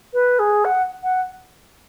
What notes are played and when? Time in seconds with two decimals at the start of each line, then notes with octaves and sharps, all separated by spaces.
0.13 B4
0.39 G#4
0.65 F#5
1.03 F#5